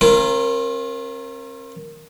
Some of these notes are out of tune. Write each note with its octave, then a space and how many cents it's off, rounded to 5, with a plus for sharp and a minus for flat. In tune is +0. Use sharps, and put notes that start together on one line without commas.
C4 +45 F4 -35 A#4 +0